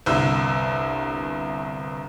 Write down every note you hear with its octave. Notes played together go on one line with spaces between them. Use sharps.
G1 C2 E6